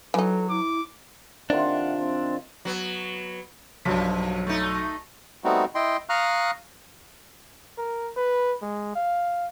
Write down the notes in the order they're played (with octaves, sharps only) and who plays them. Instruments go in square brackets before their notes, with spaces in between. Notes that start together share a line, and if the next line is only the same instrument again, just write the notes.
[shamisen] E3 D#4 [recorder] F#3 [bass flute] A4
[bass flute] E4 [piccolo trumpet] D6
[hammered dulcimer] C3 D#3 F4 [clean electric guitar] D4 [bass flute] F#5
[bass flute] C4
[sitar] F#3 B3
[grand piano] B1 [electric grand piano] G2 F#3 B6 [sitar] F3
[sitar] A3 D#4
[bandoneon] G3 A3 B3 C4 D#4 F#4
E4 D#5 G5 C6
F5 A#5 C#6 D#6 F6 F#6
[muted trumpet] A#4
B4
G#3
F5